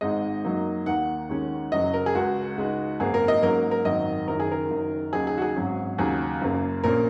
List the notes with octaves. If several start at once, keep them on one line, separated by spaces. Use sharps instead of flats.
G#1 G#2 G#3 D#4 D#5
F#2 F#3 A#3 D#4
D#2 D#3 A#3 F#5
D#2 D#3 G#3 C#4
F#1 F#2 C#3 F#3 D#5
A#4
G#4
C#2 C#3 G#3 F#4
C#2 C#3 G#3 D#4
G#1 F#2 C#3 A#3 G#4
A#4
D#5
G#2 F#3 A#3 C#4 A#4
A#4
G#1 F#2 D#3 F#3 D#5
F#1 F#2 D#3 A#4
G#4
A#4
F#1 F#2 D#3
D#2 C#3 F#3 D#4 G#4
G#4
F#4
G#4
G#1 G#2 F#3 C#4
D#2 C#3 F#3 G#4
F#1 F#2 C#3 A#3
A#1 A#2 A#3 C#4 A#4